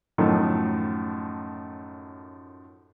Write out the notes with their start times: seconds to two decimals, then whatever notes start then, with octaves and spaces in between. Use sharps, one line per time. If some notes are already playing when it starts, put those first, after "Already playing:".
0.18 F#2 A2 D#3 F3